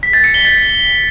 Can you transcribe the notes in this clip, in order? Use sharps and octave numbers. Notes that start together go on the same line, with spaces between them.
B6
A6
C#7
G7
A6